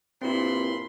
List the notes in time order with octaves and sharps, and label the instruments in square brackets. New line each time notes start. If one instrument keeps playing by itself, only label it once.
[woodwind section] G2 A#2 [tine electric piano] C4 E4 [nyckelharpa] B5 C6